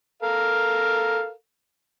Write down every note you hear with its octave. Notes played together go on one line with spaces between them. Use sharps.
A4 A#4 F5